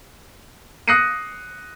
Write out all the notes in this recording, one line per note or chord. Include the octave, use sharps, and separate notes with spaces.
D#6 F#6 A#6 C7 C#7 D#7